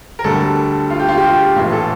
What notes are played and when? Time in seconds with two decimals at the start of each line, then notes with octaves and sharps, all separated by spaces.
0.19 A#4
0.24 D2 D3 G3 A4
0.90 F4
0.99 G4
1.09 F4
1.18 G4
1.27 F4
1.56 A#1 A2 E3 F4
1.72 A4